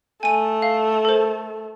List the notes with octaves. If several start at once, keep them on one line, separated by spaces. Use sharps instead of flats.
A3 G#5 D#7
F5
A4 A#4 C5